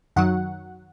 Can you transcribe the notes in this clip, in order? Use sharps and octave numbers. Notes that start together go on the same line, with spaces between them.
F#2 D#3 F#3 F#5